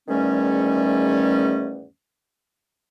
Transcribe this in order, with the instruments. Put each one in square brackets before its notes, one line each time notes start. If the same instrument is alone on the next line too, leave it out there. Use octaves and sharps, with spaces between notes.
[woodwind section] E2 G#2 D#3 G3 A3 C#4